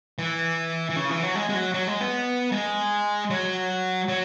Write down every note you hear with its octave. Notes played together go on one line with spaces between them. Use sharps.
E3
E3
C#3
E3
F#3
G#3
G#3
F#3
F#3
G#3
B3
G#3
F#3
F#3